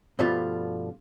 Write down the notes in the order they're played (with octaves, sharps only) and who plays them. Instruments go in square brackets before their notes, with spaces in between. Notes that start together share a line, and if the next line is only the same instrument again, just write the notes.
[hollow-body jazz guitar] G2 B2 F3 G3 A3 F4